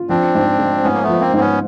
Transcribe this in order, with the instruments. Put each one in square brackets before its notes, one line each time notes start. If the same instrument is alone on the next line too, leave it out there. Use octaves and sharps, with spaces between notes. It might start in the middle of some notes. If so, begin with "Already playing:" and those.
Already playing: [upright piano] F4
[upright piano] F3 [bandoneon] C4 D4
[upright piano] G#2
G#3
[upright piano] G#2 [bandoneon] B3 C#4
[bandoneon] A#3
[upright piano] F3 [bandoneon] A3 B3
[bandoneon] A#3 C4
[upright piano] G#2
[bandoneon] B3 C#4